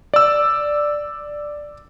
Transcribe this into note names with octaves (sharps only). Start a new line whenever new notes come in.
D5 E6